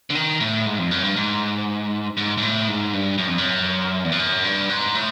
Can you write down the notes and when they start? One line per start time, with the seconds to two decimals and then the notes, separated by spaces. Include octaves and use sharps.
0.10 D3
0.15 D#3
0.41 A2
0.66 G#2
0.79 F2
0.91 F#2
1.04 G2
1.16 G#2
2.17 G#2
2.38 G#2
2.42 A2
2.68 G#2
2.93 G2
3.18 F#2
3.28 F2
3.38 F#2
4.04 E2
4.12 F2
4.19 F#2
4.44 G2
4.70 G#2
4.95 A2